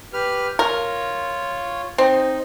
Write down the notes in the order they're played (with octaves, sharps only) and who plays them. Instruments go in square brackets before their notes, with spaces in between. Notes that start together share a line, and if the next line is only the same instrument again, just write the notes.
[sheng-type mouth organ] G4 B4 F6
[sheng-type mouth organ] F4 C#5 [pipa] A#4
[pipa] C4 [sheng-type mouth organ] D#4